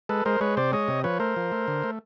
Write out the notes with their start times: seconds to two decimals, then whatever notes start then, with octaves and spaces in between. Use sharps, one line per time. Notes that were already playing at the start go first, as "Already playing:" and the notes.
0.09 G#3 A4 B4
0.25 G#3 A#4 C5
0.41 G#3 B4 C#5
0.57 C3 C5 D5
0.72 G#3 C#5 D#5
0.88 C3
1.04 F3 B4 C#5
1.20 A3 A#4 C5
1.36 F3
1.52 A3
1.68 D3
1.84 A3